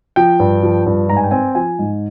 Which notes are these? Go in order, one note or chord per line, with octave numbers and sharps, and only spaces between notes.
F3 G5
G2
F3
G2
G#2 A#5
G#5
G5
C4 G#5
F3 G#5
G#2